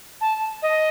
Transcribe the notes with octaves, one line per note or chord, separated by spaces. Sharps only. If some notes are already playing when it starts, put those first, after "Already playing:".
A5
D#5